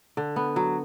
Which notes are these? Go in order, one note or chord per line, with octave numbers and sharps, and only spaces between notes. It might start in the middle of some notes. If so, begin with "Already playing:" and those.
D3
B3
F#3